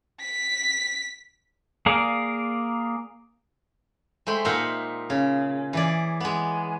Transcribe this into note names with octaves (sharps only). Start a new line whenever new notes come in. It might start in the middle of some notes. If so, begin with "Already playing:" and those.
B6
A#3 G#4 A#4 D5 F5
G#3 A3 C5 G5 B5 C6
A#2 D#4 E5 F#5 C6
C#3
E3 G#4 D5
G#3 B3